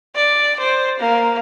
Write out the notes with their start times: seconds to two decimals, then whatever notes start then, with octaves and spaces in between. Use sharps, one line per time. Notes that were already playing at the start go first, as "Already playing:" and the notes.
0.15 D5
0.60 C5
1.00 A#3